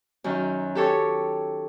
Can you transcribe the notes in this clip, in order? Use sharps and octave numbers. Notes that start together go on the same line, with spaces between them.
F#2 D#3
G4 A4 C#5